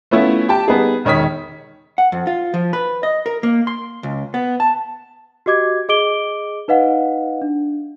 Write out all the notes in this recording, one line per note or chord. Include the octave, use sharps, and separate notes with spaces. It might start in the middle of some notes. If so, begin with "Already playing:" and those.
A3 B3 C#4 E4 F4
G4 G5 A5
G3 B3 D#4 G#4
E1 D#3 C#5 D#6 B6
F#5
F2
F4
F3
B4
D#5
A#4
A#3
C6
C#2
B3
A5
F#4 G4 D#5 D6 G#6
G#4 D#5 D6 D7 G7
D#4 B4 D#5 F5 F#5
D4